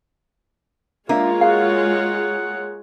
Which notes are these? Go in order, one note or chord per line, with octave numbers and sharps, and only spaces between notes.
G#3 A#3 D4 F4 C#5 E5
F#4 G#4 F5 F#5